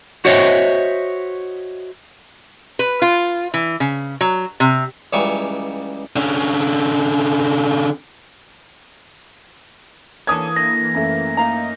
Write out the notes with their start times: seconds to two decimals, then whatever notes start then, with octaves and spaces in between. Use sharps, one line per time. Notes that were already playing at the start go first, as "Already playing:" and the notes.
0.25 F#4 C5 C#5 D#5 E5
2.79 B4
3.02 F4
3.54 E3
3.80 C#3
4.21 F#3
4.60 C3
5.13 C#2 C#3 E3 F#3 G3 C#6
6.16 D3 C#4
10.27 E3 A#3 C#4 D4 A4 D#6 G#6
10.56 D3 A#6
10.94 F#2 A3
11.37 A#3 D#4 F5 A#5